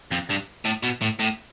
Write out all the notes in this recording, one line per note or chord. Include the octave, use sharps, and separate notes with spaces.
F2
G2
A2
B2
A2
A2